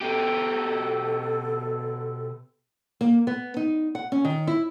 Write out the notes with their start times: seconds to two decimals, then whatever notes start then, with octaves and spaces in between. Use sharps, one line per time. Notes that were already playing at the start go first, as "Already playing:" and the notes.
0.01 B2 G4 A4
3.01 A#3
3.27 B3
3.57 D#4
3.95 F#5
4.12 C#4
4.25 D#3
4.47 E4